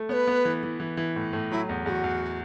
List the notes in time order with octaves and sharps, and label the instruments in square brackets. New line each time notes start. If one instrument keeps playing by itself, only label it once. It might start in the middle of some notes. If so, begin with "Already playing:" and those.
Already playing: [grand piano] A3
[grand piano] B3 [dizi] C#5
[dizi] B4
[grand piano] B3
E3
E3
E3
E3
A2
A2
[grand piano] F#3 [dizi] E4
[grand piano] E2
[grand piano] E2 [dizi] G#4
[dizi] F#4
[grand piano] E2